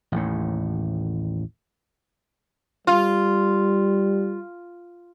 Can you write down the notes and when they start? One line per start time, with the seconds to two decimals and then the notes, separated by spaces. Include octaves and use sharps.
0.12 A1 D#2 A2
2.87 G3 F4